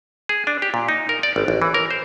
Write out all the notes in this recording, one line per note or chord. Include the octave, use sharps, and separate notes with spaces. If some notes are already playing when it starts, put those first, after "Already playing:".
G#4
D4
G4
A#2
D#4
A#4
D5
G#1
A1
E3
A#4
C5